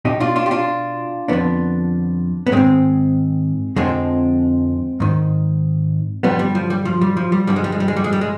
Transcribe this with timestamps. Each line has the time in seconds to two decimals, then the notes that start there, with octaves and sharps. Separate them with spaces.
0.05 B2 D#4 G4
0.20 D4 F4
0.36 D4 F4
0.46 G4
0.51 D4 F4
1.28 F2 D3 F3 B3 D4
2.47 B3
2.52 G#2 D#3 G#3 C4
3.76 F2 D3 F3 G#3 C4
5.00 G#2 D#3
6.23 G2 D3 F3 G3 B3
6.39 G3
6.55 F3
6.70 G3
6.85 F3
7.01 G3
7.17 F3
7.32 G3
7.47 G2 D3 F3 G3
7.56 G#3
7.64 G3
7.72 G#3
7.80 G3
7.88 G#3
7.97 G3
8.04 G#3
8.13 G3
8.21 G#3